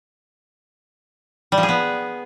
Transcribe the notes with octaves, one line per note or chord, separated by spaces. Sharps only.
G3
F3
G#4
B3